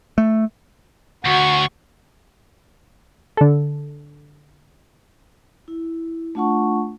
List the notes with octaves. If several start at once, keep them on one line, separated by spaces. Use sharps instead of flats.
A3
D2 F#4 C#6
D3 A4
E4
A3 D4 F4 F#5 A5 C#6